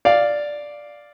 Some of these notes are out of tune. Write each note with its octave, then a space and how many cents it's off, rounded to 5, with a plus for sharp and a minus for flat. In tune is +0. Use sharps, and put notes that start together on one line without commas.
D5 +0 F5 +0